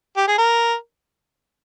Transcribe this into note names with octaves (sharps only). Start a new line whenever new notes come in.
G4
G#4
A#4